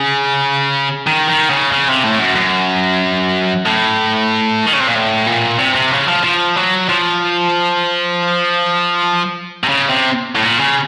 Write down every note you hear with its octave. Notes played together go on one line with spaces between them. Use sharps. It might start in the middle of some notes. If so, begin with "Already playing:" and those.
Already playing: C#3
D#3
D#3
C#3
C#3
C3
A2
F#2
F#2
A2
D#3
C#3
C3
A#2
A2
A#2
C3
C3
C#3
F3
F3
F#3
F3
C3
C#3
C3
A2
A#2
C#3